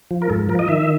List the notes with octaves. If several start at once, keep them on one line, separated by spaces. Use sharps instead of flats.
F3
A#4
G#2 A4
F3 A#4
D#5
D#3 E5